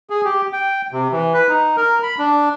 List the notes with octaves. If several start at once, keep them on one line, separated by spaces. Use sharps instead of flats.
G#4
G4
G5
C3
E3
B4
D#4
A#4
B5
D4